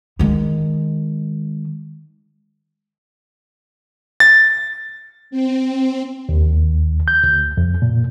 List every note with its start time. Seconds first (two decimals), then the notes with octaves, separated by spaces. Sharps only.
0.19 D#3 G#3
4.20 A6
5.31 C4
6.29 D#2
7.08 G6
7.24 D2
7.57 F2
7.82 A#2